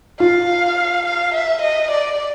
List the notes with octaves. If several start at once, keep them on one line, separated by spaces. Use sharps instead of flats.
F4 F5
F5
E5
D#5
D5